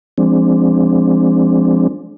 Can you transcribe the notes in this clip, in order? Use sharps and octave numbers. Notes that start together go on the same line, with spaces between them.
F3 G#3 C4 D4